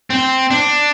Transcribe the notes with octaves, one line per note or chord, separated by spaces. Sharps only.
C4
D4